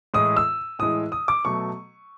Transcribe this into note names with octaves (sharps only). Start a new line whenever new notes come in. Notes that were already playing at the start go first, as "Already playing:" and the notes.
A2 E3 G#3 D#6
E6
A2 E3 G#3 D#6
D#6
D6
B2 F#3 A3 C#6